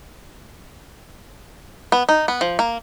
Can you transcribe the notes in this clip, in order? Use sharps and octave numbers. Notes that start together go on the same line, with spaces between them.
B3
D#4
B3
F3
A#3